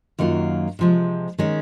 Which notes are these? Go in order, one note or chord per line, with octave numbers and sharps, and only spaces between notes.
F#2 D#3 F#3 A#3 F4
C3 F3 G#3
D#3 G#3 C#4